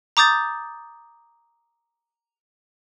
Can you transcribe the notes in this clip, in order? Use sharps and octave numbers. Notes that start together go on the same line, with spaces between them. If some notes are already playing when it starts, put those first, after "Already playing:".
A#5 D6 D#6 G6 A6